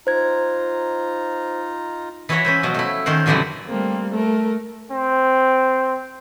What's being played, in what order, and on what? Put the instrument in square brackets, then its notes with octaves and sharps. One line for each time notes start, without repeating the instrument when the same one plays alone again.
[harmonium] D#4 F4 A#5 [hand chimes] C5 G#6
[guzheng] E3 E4 F#4 C#5 E5 A#5
C#4 B4 C5
B2 F3 F#3
A3 E4
D#3 C#4 A#4 C5 F#5
F2 A#2 D3 E3 F#3 G3
[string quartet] G3 A3 A#3 C4
A3 A#4
[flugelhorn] C4